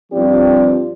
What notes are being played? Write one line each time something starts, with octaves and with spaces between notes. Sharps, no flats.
G2 F3 C4 F4 G4 D5